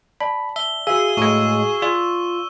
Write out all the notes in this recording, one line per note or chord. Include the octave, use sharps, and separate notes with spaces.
D5 A5 B5
E5 G7
F#4 G#4 F5 E6 D#7
A2 G#3 C#6 D#7
F4 D5